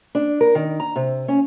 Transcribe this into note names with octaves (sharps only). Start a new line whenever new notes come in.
D4
A#4
D#3
A#5
C3
C#4